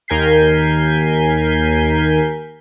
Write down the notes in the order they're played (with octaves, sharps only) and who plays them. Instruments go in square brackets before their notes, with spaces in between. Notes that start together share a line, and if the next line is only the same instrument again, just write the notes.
[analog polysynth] D#2 A#4 G#5 G6 B6 C7